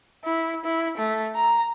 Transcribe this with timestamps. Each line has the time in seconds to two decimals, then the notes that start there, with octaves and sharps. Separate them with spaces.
0.25 E4
0.65 E4
0.97 A3
1.35 A#5